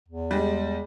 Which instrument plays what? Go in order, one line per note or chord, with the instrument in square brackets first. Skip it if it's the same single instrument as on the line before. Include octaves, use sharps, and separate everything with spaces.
[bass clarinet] E2
[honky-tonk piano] G3 G#3